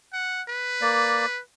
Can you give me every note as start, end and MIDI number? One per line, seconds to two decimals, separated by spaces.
0.13 0.42 78
0.48 1.40 71
0.81 1.26 58
0.81 1.26 74